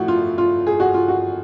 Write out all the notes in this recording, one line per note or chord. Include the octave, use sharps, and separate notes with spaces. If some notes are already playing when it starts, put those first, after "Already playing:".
Already playing: A2 F3 A3 F#4
F4
F4
G#4
F#4
F4
F#4